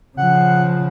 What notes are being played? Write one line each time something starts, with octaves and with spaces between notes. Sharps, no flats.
C#3 F3 F#5